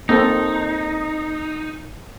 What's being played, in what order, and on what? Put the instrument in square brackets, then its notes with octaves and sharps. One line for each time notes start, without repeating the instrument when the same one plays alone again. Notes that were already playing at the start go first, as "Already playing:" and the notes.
[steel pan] A#3 C4 A4 [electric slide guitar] D#4